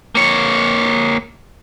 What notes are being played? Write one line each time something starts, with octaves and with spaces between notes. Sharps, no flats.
A#3 C#5